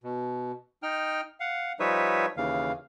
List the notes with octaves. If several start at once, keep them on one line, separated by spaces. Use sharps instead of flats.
B2
D#4 G5 F6
F5 F#5
F3 G3 D#4 B4 C#5 E5
D#2 C#3 E3 F5